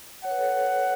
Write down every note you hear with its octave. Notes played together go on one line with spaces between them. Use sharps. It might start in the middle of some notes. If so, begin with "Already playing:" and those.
C#5 F#5
B4
A4 C#5